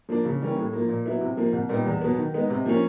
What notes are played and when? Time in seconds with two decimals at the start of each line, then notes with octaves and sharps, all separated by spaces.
0.09 F3 A#3 D4
0.25 C#3
0.40 E3 G3 A#3 C#4
0.56 A2
0.73 F3 A#3
0.89 A#2
1.06 F#3 B3 E4
1.21 C3
1.37 F3 A#3
1.53 C2
1.69 A#2 G3 B3 D#4
1.86 E2
2.01 B2 F#3 B3
2.18 D#3
2.34 G#3 B3 D#4
2.50 C3
2.65 F3 A#3 C#4